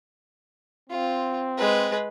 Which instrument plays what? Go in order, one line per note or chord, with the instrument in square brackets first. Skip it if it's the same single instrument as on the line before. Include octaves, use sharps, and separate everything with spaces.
[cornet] C4 [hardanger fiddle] F4
[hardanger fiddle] G#3 B4